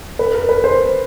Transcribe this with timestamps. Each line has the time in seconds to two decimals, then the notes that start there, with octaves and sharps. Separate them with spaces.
0.19 B4
0.34 A#4
0.49 B4
0.64 C5